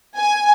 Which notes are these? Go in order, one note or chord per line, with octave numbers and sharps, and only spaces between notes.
G#5